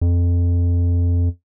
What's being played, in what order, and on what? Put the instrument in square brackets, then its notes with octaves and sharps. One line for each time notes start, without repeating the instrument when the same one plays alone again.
[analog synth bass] F2